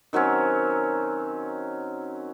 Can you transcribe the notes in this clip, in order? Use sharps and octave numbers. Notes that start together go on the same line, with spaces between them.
D#3 F#3 C4 C#4